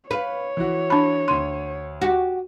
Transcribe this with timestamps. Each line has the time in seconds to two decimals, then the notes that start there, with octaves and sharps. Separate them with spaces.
0.11 B4 C#5 F5 B5
0.57 E3 E4 F#4
0.90 D4 B5
1.28 D2 C6 D#7
2.02 F#4 G4